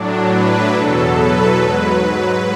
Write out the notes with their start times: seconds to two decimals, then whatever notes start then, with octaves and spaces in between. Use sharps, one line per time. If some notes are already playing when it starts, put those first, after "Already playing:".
Already playing: A2 F#3 D4
0.30 B4
0.72 E2 B2 F#3 A4
1.16 B4
1.58 G#2 F#3